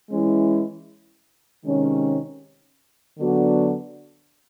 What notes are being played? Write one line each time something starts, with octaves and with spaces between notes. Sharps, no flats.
E3 G#3 C#4 E4
C3 D#3 G#3 C#4
D3 F#3 B3 D4 F#4